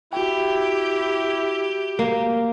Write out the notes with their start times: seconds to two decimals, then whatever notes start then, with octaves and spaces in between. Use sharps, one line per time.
0.13 E4 F#4 G4 G5
1.99 A#3